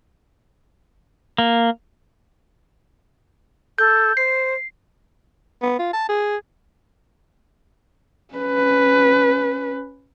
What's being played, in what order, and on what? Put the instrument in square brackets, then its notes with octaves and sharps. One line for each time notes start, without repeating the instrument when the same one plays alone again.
[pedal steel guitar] A#3
[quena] A4 [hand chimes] G6
[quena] C5 [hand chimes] C7
[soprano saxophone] B3
F4
A5
G#4
[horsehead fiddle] C#4 B4